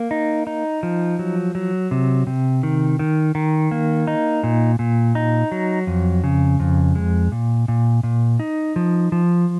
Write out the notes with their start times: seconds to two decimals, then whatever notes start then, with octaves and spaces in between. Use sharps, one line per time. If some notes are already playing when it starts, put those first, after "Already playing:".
Already playing: A#3
0.11 D#4
0.47 D#4
0.83 F3
1.19 F#3
1.55 F#3
1.91 C3
2.27 C3
2.63 D#3
2.99 D#3
3.35 D#3
3.71 A#3
4.07 D#4
4.44 A#2
4.79 A#2
5.15 D#4
5.52 F#3
5.87 F2
6.24 C#3
6.60 F2
6.95 G#3
7.32 A#2
7.68 A#2
8.03 A#2
8.40 D#4
8.76 F3
9.12 F3